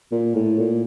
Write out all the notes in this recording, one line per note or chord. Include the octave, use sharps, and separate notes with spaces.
A#2
A2
A#2